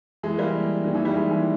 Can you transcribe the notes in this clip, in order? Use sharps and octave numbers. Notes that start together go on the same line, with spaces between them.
E3 G#3
G3 A#3
D#3
E3
G3
E3 G#3
E3